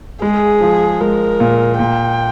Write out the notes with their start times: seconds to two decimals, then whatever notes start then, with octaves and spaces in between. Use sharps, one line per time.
0.22 G#3 G#4
0.61 F3
1.00 G#3 A#4
1.40 A#2
1.78 A#2 G5